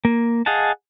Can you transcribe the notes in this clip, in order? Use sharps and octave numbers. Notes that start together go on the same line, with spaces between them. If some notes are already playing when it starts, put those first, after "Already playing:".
A#3
G#4 D#5 F5 F#5 A5